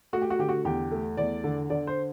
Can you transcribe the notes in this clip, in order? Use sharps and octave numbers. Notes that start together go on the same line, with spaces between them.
A3 F#4
G4
F#4
D3 G4
F#4
E2 G4
A3
E2 D5
D3
D3 D5
C5